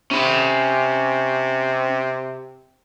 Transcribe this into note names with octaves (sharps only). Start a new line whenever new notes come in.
C3 C#4 B5